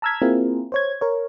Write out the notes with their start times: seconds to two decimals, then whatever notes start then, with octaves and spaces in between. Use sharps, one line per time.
0.02 A5 A#5 E6 F6 G#6 B6
0.22 A#3 C4 E4 F4 G#4 A#4
0.72 C5 C#5 G#6
1.01 A#4 C#5